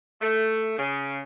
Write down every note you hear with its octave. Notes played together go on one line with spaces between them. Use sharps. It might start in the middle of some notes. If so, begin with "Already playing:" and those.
A3
C#3